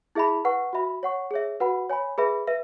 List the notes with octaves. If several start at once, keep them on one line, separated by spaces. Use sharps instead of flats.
E4 G#4 E5 B5
B4 F#5 C#6
F#4 E5 B5
C#5 F#5 C#6
G#4 C#5 E5
F#4 B4 F#5 B5
C#5 G#5 B5
G#4 B4 E5 B5
B4 E5